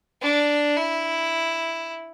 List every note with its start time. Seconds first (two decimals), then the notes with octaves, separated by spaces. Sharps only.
0.22 D4
0.77 E4